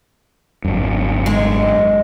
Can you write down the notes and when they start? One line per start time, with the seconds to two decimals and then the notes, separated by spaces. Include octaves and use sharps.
0.65 G#1 F#2
1.26 G#3